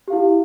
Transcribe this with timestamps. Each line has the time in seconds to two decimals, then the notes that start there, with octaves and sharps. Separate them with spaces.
0.08 G4
0.10 F5
0.13 E4